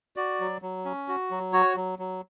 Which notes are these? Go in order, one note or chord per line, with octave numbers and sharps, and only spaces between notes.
F#4 D5
F#3
F#3
C#4
F#4
F#3
F#4 C#5
F#3
F#3